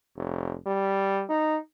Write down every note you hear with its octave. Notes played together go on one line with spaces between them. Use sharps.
F1
G3
D#4